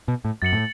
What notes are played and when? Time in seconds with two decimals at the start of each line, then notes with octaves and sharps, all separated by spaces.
0.08 B2
0.25 A2
0.42 F#2 A6 C#7 F#7
0.53 A2